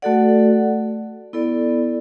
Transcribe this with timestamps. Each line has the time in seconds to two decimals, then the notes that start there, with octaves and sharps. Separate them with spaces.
0.02 A3 F#4 A4 D5 F#5
1.33 B3 E4 A4 D5